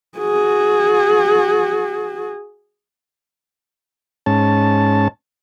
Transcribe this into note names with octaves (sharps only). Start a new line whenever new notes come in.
F#4 G#4
G#2 C#4 A5